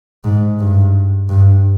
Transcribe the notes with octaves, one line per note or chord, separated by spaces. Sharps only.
G#2
G2
G2